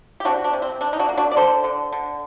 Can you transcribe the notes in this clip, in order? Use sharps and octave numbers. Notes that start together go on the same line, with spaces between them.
G4
C3 D4 F#4
D4
C3
C4
C3 D4
D#4
D4 F#4
A#3
D4 F#4
D5
D3 A4 C5
D3
D3